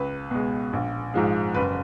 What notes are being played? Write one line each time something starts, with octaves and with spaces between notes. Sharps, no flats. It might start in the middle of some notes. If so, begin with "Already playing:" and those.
Already playing: C#2 B4
B2 G#3
A#1
G#2 F3 G#3
F#1 B4